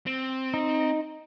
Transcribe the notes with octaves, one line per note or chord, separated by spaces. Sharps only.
C4
D#4